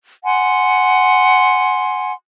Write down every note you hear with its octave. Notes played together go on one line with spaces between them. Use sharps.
F#5 G#5 C6